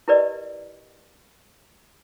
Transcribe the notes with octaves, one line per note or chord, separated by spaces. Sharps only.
E4 G4 A#4 B4 D5 D#5